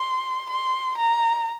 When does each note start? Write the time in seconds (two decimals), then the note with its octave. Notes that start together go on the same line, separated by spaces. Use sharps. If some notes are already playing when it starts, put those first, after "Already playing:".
Already playing: C6
0.50 C6
0.98 A#5